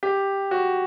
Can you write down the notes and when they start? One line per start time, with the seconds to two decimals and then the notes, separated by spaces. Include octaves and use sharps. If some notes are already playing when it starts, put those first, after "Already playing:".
0.03 G4
0.51 F#4